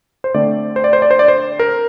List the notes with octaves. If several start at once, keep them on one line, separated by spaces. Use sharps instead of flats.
C5
D3 A3 C4 D5
C5
D5
C5
D5
C5
D5
C5
A#4